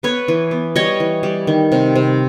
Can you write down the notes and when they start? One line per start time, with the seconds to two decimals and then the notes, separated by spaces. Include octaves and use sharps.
0.03 B3 B4 C#5
0.28 E3
0.51 B3
0.76 G3 C#5 D#5
1.00 E3
1.23 G3
1.47 D#3
1.72 C3
1.95 C3